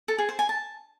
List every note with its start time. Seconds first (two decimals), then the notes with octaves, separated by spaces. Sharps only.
0.08 A4
0.18 G#4
0.29 C5
0.39 G#5
0.49 A5